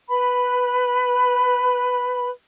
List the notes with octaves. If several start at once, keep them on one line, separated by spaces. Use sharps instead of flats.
B4 B5